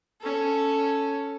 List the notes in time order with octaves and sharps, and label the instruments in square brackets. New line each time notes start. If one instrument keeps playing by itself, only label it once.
[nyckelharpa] C#4 A4